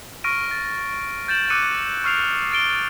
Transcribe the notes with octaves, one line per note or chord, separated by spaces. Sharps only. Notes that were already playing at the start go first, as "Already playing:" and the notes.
C#6 F6 A#6 D7 D#7
A6
G6 A6 D7 E7 F#7
D6 E6 F#6 C#7 D#7
C#6 D#6 F6 C7 D7 F7
F6 A6 D7 G7